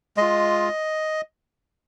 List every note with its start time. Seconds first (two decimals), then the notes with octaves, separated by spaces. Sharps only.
0.17 G#3 F4 D#5